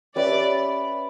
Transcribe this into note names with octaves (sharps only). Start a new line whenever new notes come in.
C#4 G4 B4 D5 E5